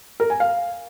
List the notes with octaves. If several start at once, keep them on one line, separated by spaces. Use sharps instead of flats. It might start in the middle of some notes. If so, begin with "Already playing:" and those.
A#4
G#5
F5